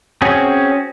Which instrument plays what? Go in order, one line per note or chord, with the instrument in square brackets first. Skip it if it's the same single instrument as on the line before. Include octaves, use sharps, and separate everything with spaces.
[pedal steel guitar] C4 C#4 F#4 G#4